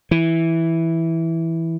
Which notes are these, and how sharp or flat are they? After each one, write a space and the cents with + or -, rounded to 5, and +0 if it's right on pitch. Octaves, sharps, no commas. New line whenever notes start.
E3 -5